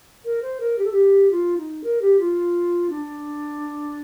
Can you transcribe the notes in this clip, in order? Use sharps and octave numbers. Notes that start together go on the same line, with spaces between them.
A#4
C5
A#4
G4
A4
G4
F4
D#4
A#4
G4
F4
D4